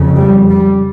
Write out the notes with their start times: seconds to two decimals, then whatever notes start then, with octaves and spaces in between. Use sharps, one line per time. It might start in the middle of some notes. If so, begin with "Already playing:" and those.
Already playing: F2 C#3
0.16 G3
0.50 G3